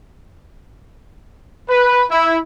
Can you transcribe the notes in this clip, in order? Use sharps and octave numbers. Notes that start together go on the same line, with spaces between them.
B4
E4